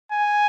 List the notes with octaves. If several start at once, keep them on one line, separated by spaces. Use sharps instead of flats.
G#5